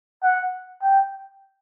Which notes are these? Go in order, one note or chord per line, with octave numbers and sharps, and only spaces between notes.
F#5
G5